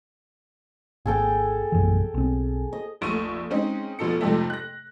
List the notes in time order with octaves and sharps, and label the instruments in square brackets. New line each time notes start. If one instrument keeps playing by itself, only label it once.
[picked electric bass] G#1 [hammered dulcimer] G#4 A4 G5
[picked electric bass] A#1 F#2 E3
B1 C4
[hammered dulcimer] D#5
[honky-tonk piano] F1 A#1 A3 C#6 D#7
G#3 C4 C#4 D#4
F1 B2 F3 A4 C#7
F2 G#2 C3 F3 G3 A3
F#6 A#6